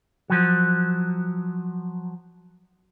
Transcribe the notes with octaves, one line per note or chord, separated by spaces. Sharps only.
F3 F#3